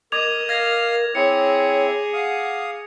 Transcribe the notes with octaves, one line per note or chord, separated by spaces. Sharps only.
A#4 D#5 D6 G#6 F7
A#4 F5 F6 G#6 A#6
C4 E4 G#4 C#5 C#7
F5 F#5 D#6